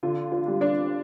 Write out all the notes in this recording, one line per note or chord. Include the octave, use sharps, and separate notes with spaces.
D3 F4
F4
G3 D4
D4 D5